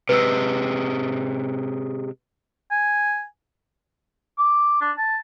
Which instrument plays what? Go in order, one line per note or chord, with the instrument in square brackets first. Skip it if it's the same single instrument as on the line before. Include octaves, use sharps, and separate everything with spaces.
[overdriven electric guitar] C3 G#3 [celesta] B4 E6
[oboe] G#5
D6
D4
A5